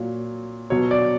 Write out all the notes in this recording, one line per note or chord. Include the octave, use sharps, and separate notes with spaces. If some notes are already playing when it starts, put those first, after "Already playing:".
Already playing: A#2 F#3
B2 F#3 C#5
D5